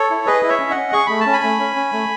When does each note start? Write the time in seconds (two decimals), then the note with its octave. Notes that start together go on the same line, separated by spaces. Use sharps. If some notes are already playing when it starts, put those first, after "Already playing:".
Already playing: A4 C#5
0.10 E4
0.26 G#4 B4 D#5
0.43 E4
0.49 C#5 E5
0.60 C#4
0.71 D#5 F#5
0.76 C#4
0.93 G#4 C#6
1.06 A3 B5
1.20 A5
1.26 C#4
1.33 G#5 B5
1.43 A3
1.59 C#4
1.76 C#4
1.93 A3